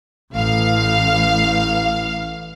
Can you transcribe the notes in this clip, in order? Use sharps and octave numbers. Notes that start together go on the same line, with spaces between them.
A1 F5